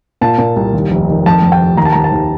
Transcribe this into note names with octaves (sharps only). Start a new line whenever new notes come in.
A#2 A5
A#2
C2
D#2
F1
D#3
F2 A5
F2
G5
F1
D#2 A#5
A5
A#5
D#2
A5
D#2